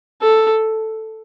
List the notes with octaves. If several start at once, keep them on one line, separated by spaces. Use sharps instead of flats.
A4